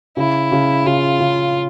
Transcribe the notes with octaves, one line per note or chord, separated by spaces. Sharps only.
C#3 E4
C#3
C#3 F4
C#3